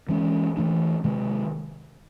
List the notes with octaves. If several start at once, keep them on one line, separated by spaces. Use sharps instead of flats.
E3 G#3 C#4
E3 A3 D4
C3 D#3 G#3